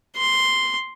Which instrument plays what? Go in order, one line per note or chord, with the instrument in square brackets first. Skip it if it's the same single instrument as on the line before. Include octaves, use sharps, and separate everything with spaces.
[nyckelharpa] C6